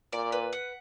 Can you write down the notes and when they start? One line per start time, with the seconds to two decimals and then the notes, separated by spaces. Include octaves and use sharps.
0.13 A#2 D5
0.32 B4
0.53 F#5